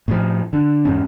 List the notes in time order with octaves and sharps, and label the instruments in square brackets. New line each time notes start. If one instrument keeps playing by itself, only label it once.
[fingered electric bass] A2 F3
D3
E2 G#2 C#4